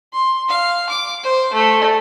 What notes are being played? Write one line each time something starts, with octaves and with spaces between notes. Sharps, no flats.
C6
F5
D6
C5
A3